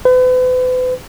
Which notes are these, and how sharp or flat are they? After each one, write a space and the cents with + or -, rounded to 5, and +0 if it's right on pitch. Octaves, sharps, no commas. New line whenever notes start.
B4 +40